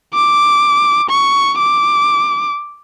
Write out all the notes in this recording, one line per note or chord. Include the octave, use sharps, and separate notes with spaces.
D6
C#6
D6